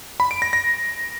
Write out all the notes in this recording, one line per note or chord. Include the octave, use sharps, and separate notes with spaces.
B5
D7
A#6
A#6